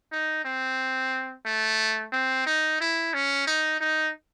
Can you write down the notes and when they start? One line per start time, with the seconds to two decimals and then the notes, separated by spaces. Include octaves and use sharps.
0.12 D#4
0.45 C4
1.46 A3
2.12 C4
2.46 D#4
2.80 E4
3.14 C#4
3.47 D#4
3.80 D#4